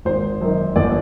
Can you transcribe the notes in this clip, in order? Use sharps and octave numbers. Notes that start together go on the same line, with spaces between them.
G#1 C5
F#2 D#3
G1 D5